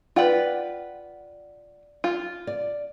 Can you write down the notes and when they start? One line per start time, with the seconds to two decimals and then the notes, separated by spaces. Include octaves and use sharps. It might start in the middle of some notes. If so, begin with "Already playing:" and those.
0.16 F4 B4 D5 F#5 G5
2.04 F4
2.47 D5